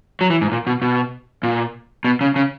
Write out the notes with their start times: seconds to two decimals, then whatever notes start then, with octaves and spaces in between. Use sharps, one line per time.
0.21 F#3
0.30 E3
0.41 G#2
0.52 A#2
0.67 B2
0.82 B2
1.43 A#2
2.04 B2
2.21 C#3
2.36 C#3